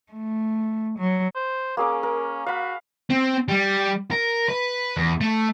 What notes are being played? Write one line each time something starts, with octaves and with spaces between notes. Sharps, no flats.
A3
F#3
C5
A#3 C#4 G#4 D6
A#4
F#4 F5 B5
C4
G3
A#4
B4
E2
A3